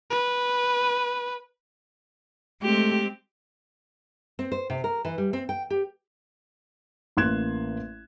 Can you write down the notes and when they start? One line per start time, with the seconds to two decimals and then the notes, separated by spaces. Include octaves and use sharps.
0.11 B4
2.62 G#3 A3 C4 G4
4.39 C4
4.52 C5
4.70 C3
4.84 A#4
5.05 E3
5.18 G3
5.33 C4
5.49 G5
5.70 G4
7.17 A1 A#3 C6 F#6 G#6 E7